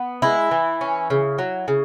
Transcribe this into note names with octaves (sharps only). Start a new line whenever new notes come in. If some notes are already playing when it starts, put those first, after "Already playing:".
Already playing: B3
G#3 E4
E3
C#4
C#3
F#3
C#3